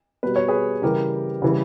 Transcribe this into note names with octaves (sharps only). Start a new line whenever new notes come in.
B2 G3 B4
C#5
G#4 B4
C#3 E3 G3 G4 A#4
C#3 E3 G3